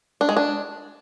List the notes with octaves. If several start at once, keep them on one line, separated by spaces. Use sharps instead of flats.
D4
G#3
D4